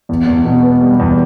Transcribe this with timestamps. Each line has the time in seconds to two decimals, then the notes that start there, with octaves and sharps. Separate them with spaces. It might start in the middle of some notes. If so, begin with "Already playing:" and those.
0.09 E2
0.27 E2
0.45 B2
0.63 B3
0.81 G3
0.99 E2